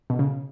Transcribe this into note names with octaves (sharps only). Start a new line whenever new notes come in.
B2
C#3